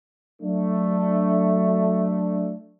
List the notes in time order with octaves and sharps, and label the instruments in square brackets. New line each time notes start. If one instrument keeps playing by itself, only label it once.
[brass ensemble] F#3 A3 D4